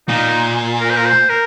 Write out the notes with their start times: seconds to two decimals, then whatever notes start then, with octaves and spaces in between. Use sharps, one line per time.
0.09 A#2 D#4
0.81 A#4
0.90 C5
0.97 A#4
1.06 C5
1.30 A#4